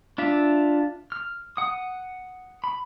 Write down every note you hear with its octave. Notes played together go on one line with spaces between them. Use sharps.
D4 F4 E5
F6
F#5 D#6
B5